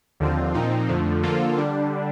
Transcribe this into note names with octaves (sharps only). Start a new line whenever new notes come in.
D#2 D3 F3 C4 F4
A#2 F3 C4 D#4
F2 D3 F3 A3
D3 F3 A#3 F4 A4
D3 G3 D4